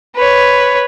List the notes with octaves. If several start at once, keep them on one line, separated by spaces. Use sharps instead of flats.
B4 C#5